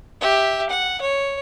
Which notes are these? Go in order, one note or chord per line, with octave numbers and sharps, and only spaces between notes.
G4 E5
F#5
C#5